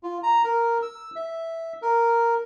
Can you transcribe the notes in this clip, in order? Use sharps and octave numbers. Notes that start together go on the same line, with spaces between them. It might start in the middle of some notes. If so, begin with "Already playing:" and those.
F4
A#5
A#4
E6
E5
A#4